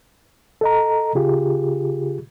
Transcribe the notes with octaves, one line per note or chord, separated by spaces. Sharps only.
A4 D#5 A#5
C#3 F4 G4 G#4